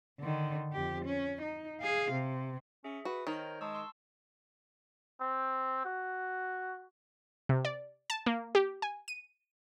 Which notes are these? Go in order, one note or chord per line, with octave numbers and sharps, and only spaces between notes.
D3 D#3
F2 G4
C#4
D#4
G#4 F5
C3
C#4 G#4 E5
F#4 B4
D#3 A#4 C5 C#5 A#5
G#3 A5 C#6 E6
C6 E6
C4
F#4
C3
D5
A5
A#3
G4
G#5
D#7